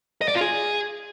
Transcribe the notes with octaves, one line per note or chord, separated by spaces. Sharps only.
D#5
D5
F4
G#4